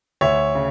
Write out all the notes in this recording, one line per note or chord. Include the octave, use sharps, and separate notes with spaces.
D2 C#5 E5
C#3